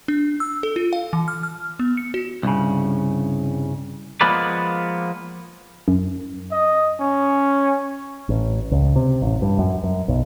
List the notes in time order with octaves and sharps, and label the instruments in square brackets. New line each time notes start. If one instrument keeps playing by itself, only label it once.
[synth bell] D4
E6
A4
F4
F5
E3
F6
F6
B3
C#7
F#4
[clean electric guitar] C2 G2 C#3
F3 G#3 A#3 B3 B4 D5
[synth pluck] F#2
[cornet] D#5
C#4
[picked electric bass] A1
C#2
C3
A1
G2
F#2
F#2
B1